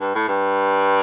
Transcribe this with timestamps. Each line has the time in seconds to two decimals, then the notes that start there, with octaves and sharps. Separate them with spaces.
0.01 G2
0.15 A2
0.28 G2